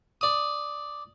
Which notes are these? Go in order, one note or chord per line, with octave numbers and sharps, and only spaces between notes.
D5 D#6